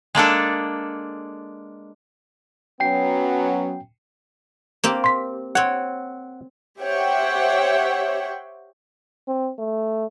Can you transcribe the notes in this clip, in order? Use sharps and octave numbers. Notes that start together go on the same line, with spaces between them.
G#3 A#3 D4 A4
F#3 B3 C#4 G5 C7
A#3 C4 G4
C6 B6
C4 C#5 F#5
G4 C5 C#5 E5 F#5 G5
C4
A3